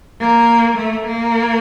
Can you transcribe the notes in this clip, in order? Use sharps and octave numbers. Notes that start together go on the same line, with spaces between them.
A#3
A3
A#3